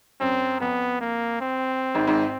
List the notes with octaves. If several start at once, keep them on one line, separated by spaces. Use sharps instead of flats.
F#2 C4
F2 B3
A#3
C4
G#1 G#2
G#1 G#2